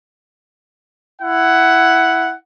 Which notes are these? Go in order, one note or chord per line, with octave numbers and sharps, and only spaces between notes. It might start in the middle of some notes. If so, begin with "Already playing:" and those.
E4 F#5